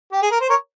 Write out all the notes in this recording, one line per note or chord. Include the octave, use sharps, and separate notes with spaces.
G4
G#4
A#4
C5
A#4 C#5